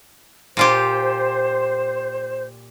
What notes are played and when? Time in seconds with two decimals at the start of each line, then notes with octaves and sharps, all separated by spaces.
0.57 A#2 F4 G4 C5